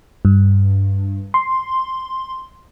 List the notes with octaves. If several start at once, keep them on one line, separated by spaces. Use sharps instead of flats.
G2
C6